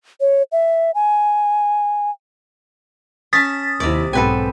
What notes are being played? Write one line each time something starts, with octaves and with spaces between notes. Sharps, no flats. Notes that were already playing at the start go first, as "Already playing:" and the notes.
C#5
E5
G#5
C#4 A5 D#6 A6 B6
D#2 C3 E4 D5
B1 G#2 B3 C4 A4 B4 G#5